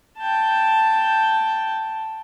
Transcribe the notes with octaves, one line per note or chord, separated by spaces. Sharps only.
G5 A5